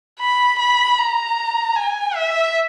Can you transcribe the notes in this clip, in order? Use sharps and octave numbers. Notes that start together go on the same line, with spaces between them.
B5
B5
A#5
G#5
E5